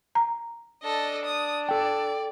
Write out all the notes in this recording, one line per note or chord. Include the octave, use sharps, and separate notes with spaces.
A#5
D4 A4 D#5
D#6
A4 D5 G5